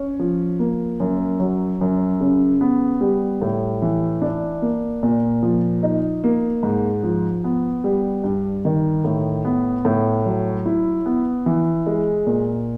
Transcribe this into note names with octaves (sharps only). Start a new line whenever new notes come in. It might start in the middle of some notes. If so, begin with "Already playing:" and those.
Already playing: C#4
F3
A#3
F#2
F#3
F#2
C#3
B3
G3
A2
E3
D4
A#3
A#2
F3
D#4
A#3
G#2
F3
B3
G3
G2
D#3
A2
B3
A2
F#3
E4
B3
E3
G#3
A#2